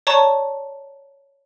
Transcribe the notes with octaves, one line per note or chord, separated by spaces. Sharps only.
C#5 D5 A5 A#5 C#6